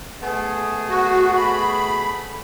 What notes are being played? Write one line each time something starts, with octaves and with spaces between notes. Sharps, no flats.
A3 B3 G#4
F#4
B5